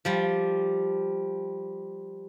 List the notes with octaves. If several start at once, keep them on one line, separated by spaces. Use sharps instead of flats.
F3 G3